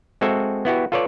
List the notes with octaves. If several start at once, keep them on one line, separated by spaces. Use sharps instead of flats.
G#3 C4 F#4 A4 E5
B3 E4 F#4 G4
F4 A4 B4 C#5 D5